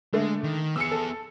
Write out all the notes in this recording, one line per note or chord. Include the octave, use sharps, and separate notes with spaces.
D3 G#3 A3
D#3
B3 G#4 E6 C#7
A4